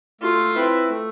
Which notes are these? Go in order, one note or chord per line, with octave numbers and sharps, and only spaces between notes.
A3 F4
C4 E4 B4 E5
A3